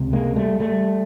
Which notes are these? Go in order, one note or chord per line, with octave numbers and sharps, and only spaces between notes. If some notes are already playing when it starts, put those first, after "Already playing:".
Already playing: C#2 C3
G#3 A#3
G3 A3
G3 A3